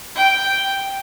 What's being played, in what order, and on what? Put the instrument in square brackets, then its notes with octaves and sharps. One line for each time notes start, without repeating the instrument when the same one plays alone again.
[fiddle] G5